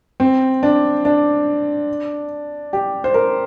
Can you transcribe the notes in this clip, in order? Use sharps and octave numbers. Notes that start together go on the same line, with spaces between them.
C4
D4
D4
G4
C5
A#4